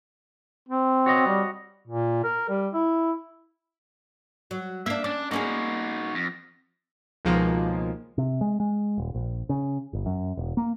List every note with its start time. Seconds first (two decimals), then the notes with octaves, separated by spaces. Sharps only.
0.69 C4
1.06 F#4 C#5 D#5
1.27 G3
1.87 A#2
2.24 A#4
2.49 G3
2.74 E4
4.51 F#3
4.86 A#3 D4 E5
5.04 C#4 D4 D5
5.31 A#3 C#4 D#4 F#4 G#4
6.15 F2
7.25 C#2 B2 D#3 F3 G#3 A#3
8.18 C3
8.41 G#3
8.60 G#3
8.98 D#1
9.15 A#1
9.49 C#3
9.93 G1
10.06 F#2
10.37 E1
10.57 A#3